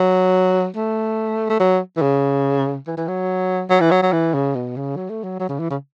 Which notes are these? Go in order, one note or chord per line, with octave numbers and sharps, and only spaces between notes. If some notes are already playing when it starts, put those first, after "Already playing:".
Already playing: F#3
A3
A3
F#3
E3
C#3
E3
E3
F#3
F#3
E3
F#3
F#3
E3
C#3
B2
C#3
F#3
A3
F#3
F#3
C#3
E3
C#3